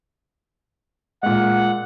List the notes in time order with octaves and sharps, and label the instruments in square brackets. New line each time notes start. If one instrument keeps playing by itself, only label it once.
[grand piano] A#2 G#3 [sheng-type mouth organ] F#5